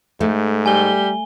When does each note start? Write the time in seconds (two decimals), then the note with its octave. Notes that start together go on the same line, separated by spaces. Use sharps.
0.21 G#2 A3
0.66 G3 G#5 G7